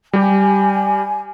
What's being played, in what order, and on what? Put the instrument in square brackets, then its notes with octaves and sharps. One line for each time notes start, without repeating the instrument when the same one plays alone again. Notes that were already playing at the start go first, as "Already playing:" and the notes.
[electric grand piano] G3 G4 [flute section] G#5